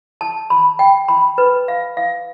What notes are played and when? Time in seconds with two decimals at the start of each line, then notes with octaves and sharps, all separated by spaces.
0.21 A5
0.50 B5
0.79 G5
1.08 B5
1.38 B4
1.68 F5
1.97 F5